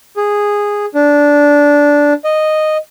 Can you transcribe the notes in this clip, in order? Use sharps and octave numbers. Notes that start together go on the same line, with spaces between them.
G#4
D4
D#5